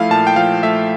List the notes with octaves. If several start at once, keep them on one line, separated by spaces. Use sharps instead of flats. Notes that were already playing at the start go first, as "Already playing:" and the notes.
Already playing: F3 A3 E4 F5
A#2 A5
G5
F3 F5
A3 E5